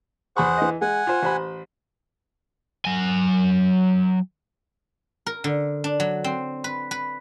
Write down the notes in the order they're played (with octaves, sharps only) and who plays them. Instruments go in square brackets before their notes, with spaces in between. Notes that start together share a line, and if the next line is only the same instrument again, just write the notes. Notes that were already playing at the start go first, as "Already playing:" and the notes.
[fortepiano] E2 B5 C#6 [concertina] G#4 C5 F#5
[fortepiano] E3 D#5
[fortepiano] G#3 [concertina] F#5 G#5
[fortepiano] F4 C5
A1 C5 B5
[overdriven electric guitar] F#3 G#5
[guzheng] A#4
D3
D4
F#3
C4
B4
B4